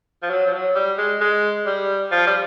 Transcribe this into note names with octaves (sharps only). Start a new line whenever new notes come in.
F3
F#3
F3
F#3
G3
G#3
G#3
G3
F3
G3